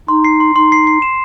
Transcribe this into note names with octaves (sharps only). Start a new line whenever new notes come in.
D#4 C6
C7
C6
D#4 C6
C7
C7
E7